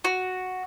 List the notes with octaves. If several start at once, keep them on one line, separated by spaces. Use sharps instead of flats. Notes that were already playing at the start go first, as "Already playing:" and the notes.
F#4